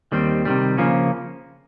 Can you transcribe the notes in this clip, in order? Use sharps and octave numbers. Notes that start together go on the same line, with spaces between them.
D#2 D#3 G3 C4
C3 D#3 G3
C#3 F3 A#3 C#4